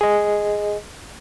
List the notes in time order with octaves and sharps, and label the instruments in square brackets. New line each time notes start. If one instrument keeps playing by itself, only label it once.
[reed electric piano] G#4 D#5